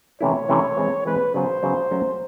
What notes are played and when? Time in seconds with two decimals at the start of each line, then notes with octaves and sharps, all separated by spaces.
0.21 C3 E3 A3 C#4 E4 C#5
0.49 C3 E3 A3 C#4 E4
0.77 E3 G#3 C4
1.05 E3 G#3 C4 B4
1.34 C#3 F#3 B3 C5
1.63 C#3 F#3 B3
1.91 F#3 A3 C#4 F#4